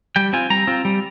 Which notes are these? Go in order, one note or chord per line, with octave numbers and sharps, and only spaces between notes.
G3 G5
C4 F4 G#5
G3 A#5
C4 F4
G3